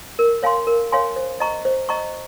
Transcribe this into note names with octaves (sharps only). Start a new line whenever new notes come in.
A#4
C#5 F5 G#5 C6
A#4
C#5 F5 G#5 C6
C5
D#5 A#5 C#6
C5
D#5 A#5 C#6